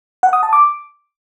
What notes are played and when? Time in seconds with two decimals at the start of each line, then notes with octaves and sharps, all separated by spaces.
0.23 F#5
0.33 D#6
0.43 A5
0.53 D6